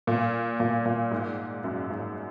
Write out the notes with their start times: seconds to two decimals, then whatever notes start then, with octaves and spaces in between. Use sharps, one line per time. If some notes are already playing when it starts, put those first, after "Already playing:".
0.07 A#2
0.60 A#2
0.86 A#2
1.11 G#2
1.64 F#2
1.90 G#2